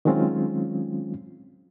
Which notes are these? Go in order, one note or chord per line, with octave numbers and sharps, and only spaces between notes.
D#3 F#3 G#3 C4 C#4 F4